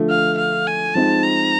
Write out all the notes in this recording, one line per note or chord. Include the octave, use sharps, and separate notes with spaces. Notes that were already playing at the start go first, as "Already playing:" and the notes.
Already playing: D3 F3 A3
F5
F5
G#5
F3 G#3 C4 D#4 A5
A#5